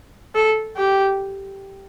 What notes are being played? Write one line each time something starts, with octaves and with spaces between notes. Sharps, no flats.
A4
G4